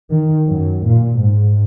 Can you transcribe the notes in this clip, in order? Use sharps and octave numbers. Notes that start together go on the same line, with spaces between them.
D#3
F#2
A#2
G#2